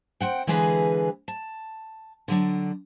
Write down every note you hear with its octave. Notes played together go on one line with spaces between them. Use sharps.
C4 F#5 G5
D3 E3 G#3 G#4 B4 F#5
A5
D3 F#3 D4